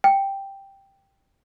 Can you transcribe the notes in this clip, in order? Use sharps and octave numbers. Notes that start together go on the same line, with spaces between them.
G5